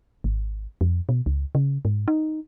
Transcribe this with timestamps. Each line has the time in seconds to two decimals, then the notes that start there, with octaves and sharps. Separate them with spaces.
0.24 G#1
0.81 F2
1.09 B2
1.26 C#2
1.55 C#3
1.85 G#2
2.08 D#4